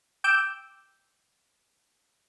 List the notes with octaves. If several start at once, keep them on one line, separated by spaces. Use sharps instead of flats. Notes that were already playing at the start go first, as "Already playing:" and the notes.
G5 D6 E6 G6